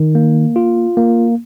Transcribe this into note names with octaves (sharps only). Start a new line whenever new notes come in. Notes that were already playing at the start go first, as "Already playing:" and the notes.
Already playing: D#3
A#3
F4
A#3